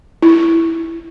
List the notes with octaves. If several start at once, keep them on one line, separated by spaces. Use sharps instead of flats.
E4